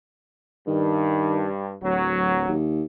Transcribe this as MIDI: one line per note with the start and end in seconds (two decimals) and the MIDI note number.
0.67 1.73 43
0.67 1.46 51
1.83 2.44 26
1.83 2.53 54
2.48 2.83 39